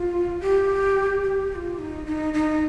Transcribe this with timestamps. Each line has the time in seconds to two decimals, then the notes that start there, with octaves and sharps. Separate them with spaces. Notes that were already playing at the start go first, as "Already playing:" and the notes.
Already playing: F4
0.41 G4
1.24 G4
1.51 G4
1.55 F4
1.79 D#4
2.07 D#4
2.34 D#4